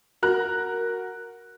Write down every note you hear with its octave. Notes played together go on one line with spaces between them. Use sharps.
F#4 A#4 A#5 F#6